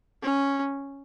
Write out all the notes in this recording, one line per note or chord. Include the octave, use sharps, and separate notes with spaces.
C#4